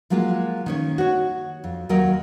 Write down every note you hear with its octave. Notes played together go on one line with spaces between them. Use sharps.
F3 F#3 G#3 A#3 F4
D#3 C#4 C#5
F#4 C#5
F2
D#2 F#3 A#4 D#5 G5